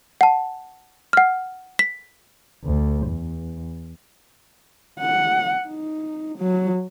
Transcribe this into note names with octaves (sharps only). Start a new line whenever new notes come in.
F#5 A5
F#5 F6
B6
D2
E2
F#5
D#4
F#3